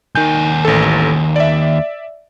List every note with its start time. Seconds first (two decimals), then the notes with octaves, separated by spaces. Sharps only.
0.15 D#2 D#3 G#5 G6
0.65 A1 A4
1.36 D5 E5